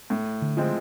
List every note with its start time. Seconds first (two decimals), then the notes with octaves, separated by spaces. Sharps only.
0.10 A2
0.42 D3
0.57 F3 G#3 C4